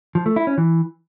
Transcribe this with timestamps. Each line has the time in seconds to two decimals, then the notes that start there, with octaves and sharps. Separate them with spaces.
0.15 F3
0.26 A3
0.36 E4
0.47 C#4
0.58 E3